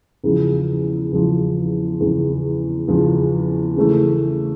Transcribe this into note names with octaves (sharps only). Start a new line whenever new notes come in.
E2 C#3 F3
E2 C#3 F3
E2 C#3 F3
E2 C#3 F3
C#3 E3 A3